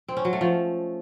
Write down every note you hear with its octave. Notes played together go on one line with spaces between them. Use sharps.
C4
C#4
F#3
A3
F3